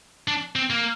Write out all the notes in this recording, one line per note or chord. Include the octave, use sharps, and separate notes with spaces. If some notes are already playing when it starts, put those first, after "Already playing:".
D4
C4
A#3